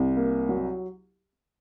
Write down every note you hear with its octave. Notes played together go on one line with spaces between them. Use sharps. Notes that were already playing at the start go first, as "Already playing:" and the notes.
Already playing: C2
A#3
F#3